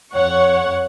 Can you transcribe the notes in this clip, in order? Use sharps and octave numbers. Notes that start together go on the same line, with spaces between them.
F2 C#5 F#5 C#6